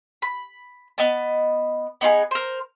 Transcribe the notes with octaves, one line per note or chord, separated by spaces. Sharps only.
B5
B3 D#5 A5
B3 D#4 F4 G#4
A#4 C5